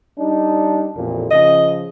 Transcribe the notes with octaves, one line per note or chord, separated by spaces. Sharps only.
G3 D4 D#4
A1 F2 A#2
C#3 F3 D#5